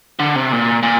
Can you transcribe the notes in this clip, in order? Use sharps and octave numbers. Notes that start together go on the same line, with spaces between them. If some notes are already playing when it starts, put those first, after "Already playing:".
D3
C3
A#2
A#2